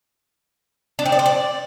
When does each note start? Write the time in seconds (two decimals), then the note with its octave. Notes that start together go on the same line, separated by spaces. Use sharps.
0.99 D4
1.06 C4
1.12 D5
1.19 C5
1.26 D5